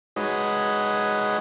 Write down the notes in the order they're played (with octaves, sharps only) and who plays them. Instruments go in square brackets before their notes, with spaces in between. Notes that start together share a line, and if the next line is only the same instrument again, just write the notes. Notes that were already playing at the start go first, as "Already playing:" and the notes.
[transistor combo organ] G#3 D#4 F#4 B4 C#5 D#5